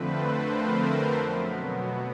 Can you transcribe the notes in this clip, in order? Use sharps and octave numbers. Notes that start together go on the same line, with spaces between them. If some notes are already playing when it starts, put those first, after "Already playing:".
Already playing: F2 D3 F3 A3 C4 B4 C5
A#4
B2 F#3 B3